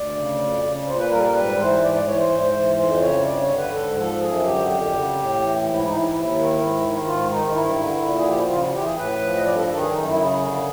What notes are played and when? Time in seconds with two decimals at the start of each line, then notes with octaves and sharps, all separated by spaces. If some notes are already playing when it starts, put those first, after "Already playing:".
Already playing: D2 D5
0.16 C#3
0.39 F2
0.63 C#3
0.87 A#2 C5
0.99 B4
1.10 G3 A#4
1.17 A4
1.23 A#4
1.34 G#2 B4
1.58 E3 C5
1.81 G#2 D5
1.94 D5
2.06 E3 C#5
2.17 C5
2.30 G#2
2.53 E3
2.77 F2 C5
3.00 C#3 C#5
3.24 G2 D5
3.41 C#5
3.49 D3
3.57 B4
3.73 G#2 A4
3.97 F3 A4
4.20 F#2 G#4
4.44 D3 G4
4.58 F#4
4.67 F2 G4
4.92 C#3
5.15 A2
5.39 E3
5.62 G#2
5.75 E4
5.87 E3 D#4
5.99 E4
6.11 D#2
6.35 D#3
6.58 G#2
6.82 D#3
7.06 G#2 F4
7.30 D#3 D#4
7.47 D#4
7.53 G2 E4
7.78 D3
8.01 A#2
8.17 G#4
8.25 F3 G4
8.38 F#4
8.49 C#3 F4
8.60 F#4
8.72 E3 G4
8.84 G#4
8.96 A2 B4
9.20 F3
9.36 D#5
9.44 G2 D5
9.55 A4
9.68 D#3 A4
9.80 G#4
9.91 F#2 D#4
10.08 E4
10.15 C#3
10.23 G#4
10.39 D3